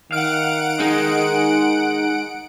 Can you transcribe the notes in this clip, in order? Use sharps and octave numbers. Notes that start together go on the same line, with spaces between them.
D#3 F5 F#5 D7
G#3 D#4